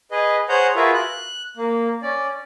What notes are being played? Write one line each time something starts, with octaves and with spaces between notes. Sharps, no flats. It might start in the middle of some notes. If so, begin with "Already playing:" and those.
G#4 B4 D#5
G#4 C5 C#5 F#5 A#5 G6
F4 F#4 G#4 A#4 B4 E5
F#6
A#3
C#4 D5